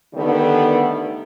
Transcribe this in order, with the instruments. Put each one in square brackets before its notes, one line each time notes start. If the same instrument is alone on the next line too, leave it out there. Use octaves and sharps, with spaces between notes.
[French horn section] D3 D#3 G3 A3 B3